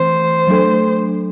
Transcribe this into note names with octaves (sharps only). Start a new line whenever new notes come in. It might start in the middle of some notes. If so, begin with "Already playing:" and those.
Already playing: E3 A3 C4 C5
F#3 A3 D4 A4